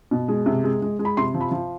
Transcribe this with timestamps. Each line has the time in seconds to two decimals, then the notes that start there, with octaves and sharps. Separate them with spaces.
0.11 B2
0.28 G#3
0.46 C3
0.64 G#3
0.82 G#3
0.99 G#3
1.05 B5
1.17 C3 C6
1.34 F3
1.41 B5
1.52 F3